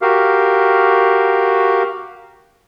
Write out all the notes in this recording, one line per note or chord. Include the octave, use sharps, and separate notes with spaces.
F#4 G4 A#4 F5